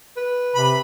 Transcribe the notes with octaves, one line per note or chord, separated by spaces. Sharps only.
B4
C3 B5